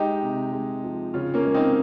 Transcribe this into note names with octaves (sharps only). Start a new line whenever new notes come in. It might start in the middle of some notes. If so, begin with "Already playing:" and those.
Already playing: G#3 D#4 G4
C3
G#3
F3
C#3 C#4 F4
A#3 C#4
G#3
C4 D#4